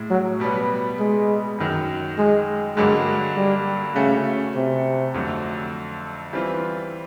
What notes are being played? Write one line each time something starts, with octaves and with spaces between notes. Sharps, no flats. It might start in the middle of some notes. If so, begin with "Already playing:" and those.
Already playing: A2 G#3
F#3
B2 G3 B3
G#3
F#2 D#3 F#3
G#3
G2 D3 F#3 G#3 A#3
G3
C#3 A3 C#4 F#4
C3
F2 D3 F#3 A3
E3 G3 C4 F4